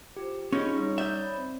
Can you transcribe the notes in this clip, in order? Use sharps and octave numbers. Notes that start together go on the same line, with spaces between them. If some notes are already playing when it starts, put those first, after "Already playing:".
F4 G4 C5
C#4 D#4 F4 G#4 D#5 B5 C#6
G3 D#4 C#5 D#6
D5 E5 G6
C#5 B5
C4 C5